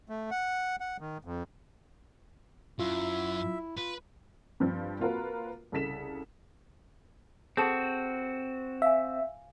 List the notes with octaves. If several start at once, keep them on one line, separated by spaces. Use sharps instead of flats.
A3
F#5
F#5
D#3
F2
F#2 E4 F4 E5
F4 B4
G2 F3 C4
A#3 C4 F4 F#4 A#4 B4
C2 C#3 A4 B6 E7
C4 F#4 G#4 A4 A5
E5 F5 G#5